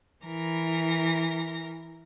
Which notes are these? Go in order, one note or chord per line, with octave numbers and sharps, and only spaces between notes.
E3 A#4 A#6